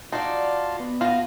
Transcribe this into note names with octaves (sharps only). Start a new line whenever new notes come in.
D#4 F4 F#4 D5 A5 C6
B3
A2 F4 F#4 D#5